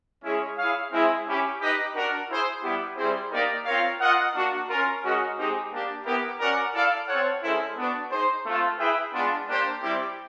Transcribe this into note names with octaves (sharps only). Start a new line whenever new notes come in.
G#3 C#4 E4 G#4 C#5
E4 G#4 C#5 F5
G#3 C4 E4
C#4 E4 G4
D#4 G4 B4 D#5
D4 F#4 A#4
E4 G#4 C5
G3 B3 E4 G4
G3 C4 E4 G#4 C5
A#3 D#4 G4 A#4 D5
C4 F4 A#4 C#5 F5
F4 A#4 D#5 F#5
A#3 D4 F#4
C#4 F4 A#4
G#3 C#4 F#4 A#4 D#5
G#3 C4 D#4 G4
A#3 D4 G4
B3 E4 G4 A#4
C#4 F#4 A#4 D5 F#5
E4 A4 D5 F5
C4 F4 A4 C#5 F#5
G#3 C#4 E4 A4 C5
B3 D4 F#4
D#4 G#4 C5
A3 C4 F4
E4 G#4 B4 E5 G5
G#3 B3 D4 F4
A#3 D4 G4 C5
G3 C4 E4 G4